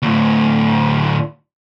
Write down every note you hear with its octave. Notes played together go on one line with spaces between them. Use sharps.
D2 A2